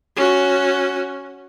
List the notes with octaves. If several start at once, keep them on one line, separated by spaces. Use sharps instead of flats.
C#4 F#4